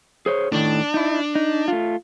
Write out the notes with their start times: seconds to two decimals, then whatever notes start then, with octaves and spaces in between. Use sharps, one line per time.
0.26 G#4 C5 C#5
0.52 A2 D#3 D4
0.94 D#4 E4
1.35 D#4
1.68 A3 F4